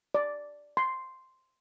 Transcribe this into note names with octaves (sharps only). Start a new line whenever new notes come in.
D5
C6